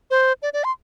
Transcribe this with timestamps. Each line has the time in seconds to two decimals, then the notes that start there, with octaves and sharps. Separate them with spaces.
0.11 C5
0.42 D5
0.53 D5
0.64 C6